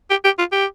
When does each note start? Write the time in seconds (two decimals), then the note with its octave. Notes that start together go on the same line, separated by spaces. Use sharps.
0.10 G4
0.24 G4
0.38 F4
0.52 G4